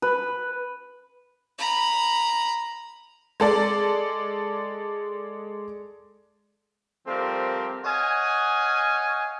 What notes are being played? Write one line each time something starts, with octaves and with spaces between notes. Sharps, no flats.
B4
A#5 B5
G#3 A4 D5
F3 G3 A3 C4 G4 A#4
C#5 D#5 F5 F#5 G#5